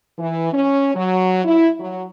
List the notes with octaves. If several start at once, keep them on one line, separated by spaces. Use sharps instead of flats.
E3
C#4
F#3
E4
F#3